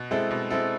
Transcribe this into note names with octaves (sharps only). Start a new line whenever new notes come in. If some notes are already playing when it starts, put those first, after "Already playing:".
Already playing: B2
G#3 C4 E4 A4
B2
G#3 C4 E4 A4